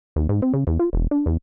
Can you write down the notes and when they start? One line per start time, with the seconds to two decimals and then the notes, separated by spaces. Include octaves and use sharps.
0.16 D#2
0.29 G#2
0.42 C4
0.54 C#3
0.67 E2
0.79 F4
0.93 E1
1.11 D4
1.26 E2